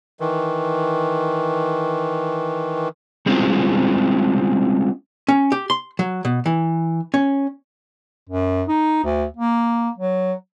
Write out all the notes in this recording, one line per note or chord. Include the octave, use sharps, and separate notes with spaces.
D#3 E3
G3 G#3 C4 C#4 E4 F4
C#4
G4
C6
F#3
B2
E3
C#4
F#2
D#4
D2
A#3
F#3